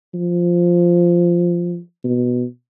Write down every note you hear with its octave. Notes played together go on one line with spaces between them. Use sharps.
F3
B2